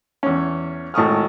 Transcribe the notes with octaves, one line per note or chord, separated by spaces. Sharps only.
E2 C#4
G#1 A2 C#6 D#6 F6